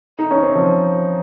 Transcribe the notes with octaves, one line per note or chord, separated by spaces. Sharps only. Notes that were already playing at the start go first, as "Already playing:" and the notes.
D#4
C#4
C4
F3